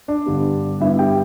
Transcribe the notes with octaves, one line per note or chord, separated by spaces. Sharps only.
D4 D5
G2 D3 G3 B3
G2 D3 G3 B3 E4 E5
G4 G5